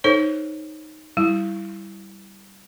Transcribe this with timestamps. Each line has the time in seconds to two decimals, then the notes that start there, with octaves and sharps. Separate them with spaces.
0.04 D#4 A4 C5 C#5
1.17 G3 E4